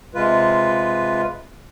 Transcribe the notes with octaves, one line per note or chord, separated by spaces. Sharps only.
C3 G#3 F4 B4